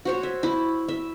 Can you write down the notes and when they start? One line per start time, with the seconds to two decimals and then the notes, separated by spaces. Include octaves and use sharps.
0.05 F#4 C5 C#5
0.23 E5
0.43 E4
0.88 E5